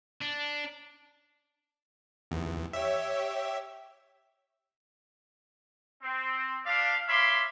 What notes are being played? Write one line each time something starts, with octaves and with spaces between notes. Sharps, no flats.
D4
E2
G4 C#5 E5
C4
D4 F4 G4 D5 F5
C#5 E5 F5 B5 C6 D6